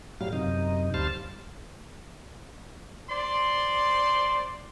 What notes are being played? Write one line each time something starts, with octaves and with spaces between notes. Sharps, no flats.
A2 F#3 G3 F5
F#2 C3 D#4
D2 G3 C5 F5 A5
C5 D5 C6